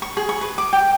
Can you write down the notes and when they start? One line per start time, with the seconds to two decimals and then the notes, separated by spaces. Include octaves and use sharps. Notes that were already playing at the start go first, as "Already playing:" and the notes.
0.02 C#6
0.17 G#4
0.29 C#6
0.41 B4
0.58 D6
0.73 G5